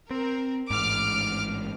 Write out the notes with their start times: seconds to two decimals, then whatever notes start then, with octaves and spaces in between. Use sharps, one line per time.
0.10 C4 A#4
0.70 A1 G#2 D6 F6